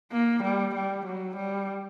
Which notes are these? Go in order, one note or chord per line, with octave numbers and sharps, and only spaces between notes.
A#3
G3
G3
F#3
G3